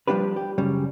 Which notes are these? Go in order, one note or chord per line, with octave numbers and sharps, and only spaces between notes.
F3 G3 B3 D4 G4 B4
G4
F#2 C#3 G3